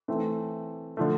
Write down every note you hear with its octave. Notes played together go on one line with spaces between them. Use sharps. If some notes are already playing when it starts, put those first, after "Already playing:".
E3 A3 C4
D3 F3 A3